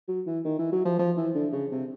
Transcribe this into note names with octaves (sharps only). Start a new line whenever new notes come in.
F#3
E3
D#3
E3
F#3
F3
F3
E3
D3
C#3
C3